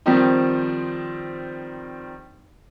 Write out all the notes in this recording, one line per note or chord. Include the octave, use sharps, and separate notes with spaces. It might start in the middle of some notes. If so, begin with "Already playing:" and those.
D#3 F3 G3 C4 D#4